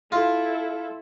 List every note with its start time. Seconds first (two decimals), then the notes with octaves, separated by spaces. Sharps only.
0.12 E4 F4 A4